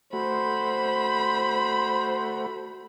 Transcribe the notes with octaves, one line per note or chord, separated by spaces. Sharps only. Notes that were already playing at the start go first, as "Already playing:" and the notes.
A3 F#4 C5 B5